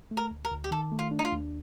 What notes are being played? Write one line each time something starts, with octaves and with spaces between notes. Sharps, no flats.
A3
A#4
D2
A#4
D2
G4
D#3 A4
A3
F4
D4
D#4
F4
D#2